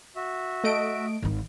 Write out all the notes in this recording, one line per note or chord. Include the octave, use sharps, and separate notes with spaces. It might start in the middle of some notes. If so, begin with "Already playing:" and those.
F#4 E5
A3 D#5 D7
G#1 D#3